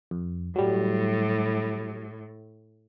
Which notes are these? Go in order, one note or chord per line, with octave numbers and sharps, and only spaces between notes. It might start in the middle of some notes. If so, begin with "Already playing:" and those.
F2
A2 F#3 G3